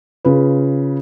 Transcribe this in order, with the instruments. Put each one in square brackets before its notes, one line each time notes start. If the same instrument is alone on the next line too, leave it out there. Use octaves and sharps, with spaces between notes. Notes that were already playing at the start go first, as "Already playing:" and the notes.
[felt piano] C#3 F4 B4